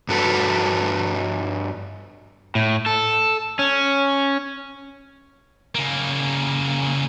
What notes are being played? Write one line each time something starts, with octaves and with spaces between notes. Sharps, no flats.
G2 F#4 A4 B4
A2
A4
C#4
C#3 A#3